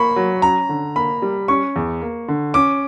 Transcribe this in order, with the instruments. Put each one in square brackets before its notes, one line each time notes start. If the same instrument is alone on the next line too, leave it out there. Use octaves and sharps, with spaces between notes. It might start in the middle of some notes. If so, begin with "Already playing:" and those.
Already playing: [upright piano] A#3 [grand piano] B5 C#6
[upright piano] F#3
[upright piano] C#4 [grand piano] A#5
[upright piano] D3
[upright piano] A#3 [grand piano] B5
[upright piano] G3
[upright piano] C#4 [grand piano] C#6
[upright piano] E2
A#3
D3
[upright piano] C#4 [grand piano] D6